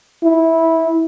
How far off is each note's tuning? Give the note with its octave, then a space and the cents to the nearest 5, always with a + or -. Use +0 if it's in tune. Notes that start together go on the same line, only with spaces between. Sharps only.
E4 -15